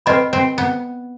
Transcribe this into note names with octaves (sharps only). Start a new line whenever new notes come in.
C4 B4 D#5 B5
C4
B3